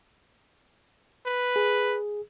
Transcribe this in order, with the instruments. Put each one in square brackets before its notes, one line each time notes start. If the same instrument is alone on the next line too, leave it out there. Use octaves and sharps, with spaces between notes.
[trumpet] B4
[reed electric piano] G#4